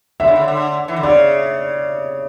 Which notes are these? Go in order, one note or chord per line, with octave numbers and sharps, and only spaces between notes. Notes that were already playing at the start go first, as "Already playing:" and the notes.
D3 E5
C#3
D3
D3
E3
D3
C#3 D5